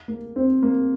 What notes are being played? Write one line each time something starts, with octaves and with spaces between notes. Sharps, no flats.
A#3
C4
A#3